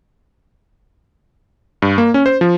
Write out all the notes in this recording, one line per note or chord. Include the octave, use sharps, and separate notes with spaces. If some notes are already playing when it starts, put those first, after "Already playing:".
G2
A#3
C#4
C5
F3